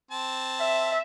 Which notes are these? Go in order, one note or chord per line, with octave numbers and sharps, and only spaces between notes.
C4 A5
E5